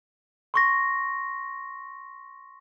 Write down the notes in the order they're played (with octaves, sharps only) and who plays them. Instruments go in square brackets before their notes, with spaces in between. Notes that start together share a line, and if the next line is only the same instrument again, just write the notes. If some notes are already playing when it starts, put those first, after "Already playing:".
[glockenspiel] C6 C#6 A#6